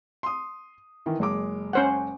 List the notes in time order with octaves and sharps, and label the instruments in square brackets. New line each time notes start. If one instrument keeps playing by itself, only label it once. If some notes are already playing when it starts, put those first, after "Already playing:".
[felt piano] C6 D#6
D#3 E3
F#1 G#3 D6
[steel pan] C#4 C5 F#5